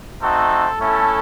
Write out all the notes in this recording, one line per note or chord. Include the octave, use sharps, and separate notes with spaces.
A3 C4 D#4 F#4 A4
A3 C#4 E4 A4